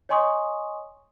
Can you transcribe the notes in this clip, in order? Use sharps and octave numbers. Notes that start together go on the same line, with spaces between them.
C#5 D#5 G#5 C6 C#6 D#6